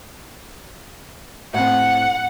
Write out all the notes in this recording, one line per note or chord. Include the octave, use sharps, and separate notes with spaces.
A2 C4 F#5